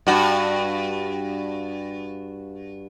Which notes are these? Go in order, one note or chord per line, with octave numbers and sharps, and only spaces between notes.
G2 F#4